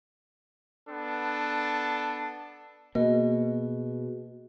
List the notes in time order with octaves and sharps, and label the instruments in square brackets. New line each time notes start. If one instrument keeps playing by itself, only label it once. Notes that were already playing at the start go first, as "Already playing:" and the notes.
[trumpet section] B3 D4 A4
[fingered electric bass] B2 [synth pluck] A#3 [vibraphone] F#4 G#4 [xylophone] D#5